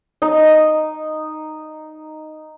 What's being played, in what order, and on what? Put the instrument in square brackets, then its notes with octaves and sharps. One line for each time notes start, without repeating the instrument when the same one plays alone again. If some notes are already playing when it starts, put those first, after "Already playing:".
[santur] D#4 D#5